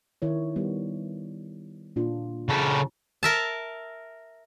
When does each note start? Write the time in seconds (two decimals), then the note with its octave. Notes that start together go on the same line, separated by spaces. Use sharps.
0.22 D#3 E4 C#5
0.56 G3 B3
1.96 A#2 D4 F4
2.49 C#3 A4
3.23 A#4 E5 A5